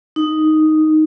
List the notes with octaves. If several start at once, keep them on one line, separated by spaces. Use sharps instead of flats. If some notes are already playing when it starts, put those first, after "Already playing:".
D#4